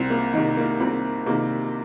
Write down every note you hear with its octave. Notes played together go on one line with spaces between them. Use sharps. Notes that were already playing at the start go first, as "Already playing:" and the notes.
Already playing: C2 C4
A#3
C3 D#3
A#3
C2 C4
C3 D#3 A#3